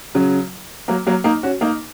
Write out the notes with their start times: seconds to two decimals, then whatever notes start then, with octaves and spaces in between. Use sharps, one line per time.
0.15 C#3 F#3
0.88 F#3 A#3
1.07 F#3 A#3
1.24 A#3 D#4
1.43 C#4 F#4
1.61 A#3 D#4